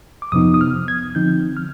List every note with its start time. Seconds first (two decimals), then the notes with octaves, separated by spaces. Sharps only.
0.22 D6
0.32 F2 C3 F3 B3 D#4 D#6
0.54 D#6
0.61 F6
0.88 G#6
1.15 D3 F3 C4 D#4 G6
1.57 F6